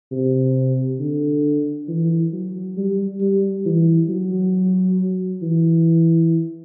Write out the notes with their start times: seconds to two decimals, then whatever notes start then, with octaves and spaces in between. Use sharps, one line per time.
0.12 C3
1.00 D3
1.88 E3
2.33 F#3
2.77 G3
3.21 G3
3.66 E3
4.09 F#3
5.42 E3